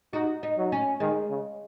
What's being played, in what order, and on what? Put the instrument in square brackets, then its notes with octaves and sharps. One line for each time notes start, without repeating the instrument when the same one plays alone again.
[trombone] D#4 [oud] F#4
[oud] D#4
[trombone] F#3
[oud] C#4
[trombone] D#3 [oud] G#3
[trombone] C#3